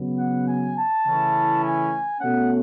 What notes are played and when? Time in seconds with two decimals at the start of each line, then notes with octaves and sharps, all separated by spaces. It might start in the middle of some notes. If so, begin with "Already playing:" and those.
Already playing: C#3 F#3 B3
0.19 F#5
0.48 G#5
0.76 A5
1.05 C#3 E3 A3 C#4 E4
1.63 G#5
2.20 B2 A3 C#4 F#5